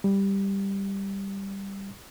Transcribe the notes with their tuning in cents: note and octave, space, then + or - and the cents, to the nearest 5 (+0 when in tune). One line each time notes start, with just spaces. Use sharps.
G3 +5